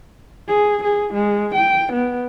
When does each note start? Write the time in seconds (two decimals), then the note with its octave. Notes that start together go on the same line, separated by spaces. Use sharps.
0.48 G#4
0.84 G#4
1.14 G#3
1.55 G5
1.93 B3